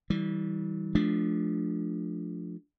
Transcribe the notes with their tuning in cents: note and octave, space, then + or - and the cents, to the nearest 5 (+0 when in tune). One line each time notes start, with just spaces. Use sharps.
E3 -35 G3 -15
F3 +0 A3 -30 D4 +0